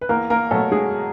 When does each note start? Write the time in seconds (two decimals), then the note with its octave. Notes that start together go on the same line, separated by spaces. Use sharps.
0.01 B4
0.09 E2 A#3 A#4
0.30 A#3 A#4
0.51 B2 F#3 A3 A4
0.72 G#3 G#4